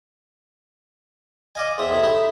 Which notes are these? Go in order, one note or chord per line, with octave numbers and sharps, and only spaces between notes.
D5 D#5 F5 G#5
E2 C4 E5 D#6
A2 C3
A3 D#4 E4